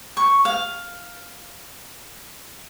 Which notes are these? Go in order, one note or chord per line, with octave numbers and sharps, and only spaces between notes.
C#6
F5